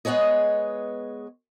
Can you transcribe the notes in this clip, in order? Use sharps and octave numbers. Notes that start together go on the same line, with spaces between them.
G#3 B3 G#4 C#5 D#5